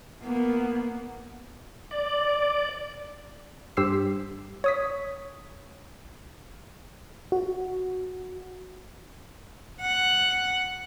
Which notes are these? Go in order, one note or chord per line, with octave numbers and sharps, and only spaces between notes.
A#3 B3
D5
G2 G4 C5 E6 B6 C7
C#5 D#6 B6
F#4
F#5